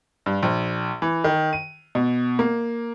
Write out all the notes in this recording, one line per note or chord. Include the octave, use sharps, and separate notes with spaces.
G2
A#1
E3
D#3
D#7
B2
A#3